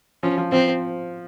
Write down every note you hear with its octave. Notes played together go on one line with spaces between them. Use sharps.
F3 C#4
F3
F3 C4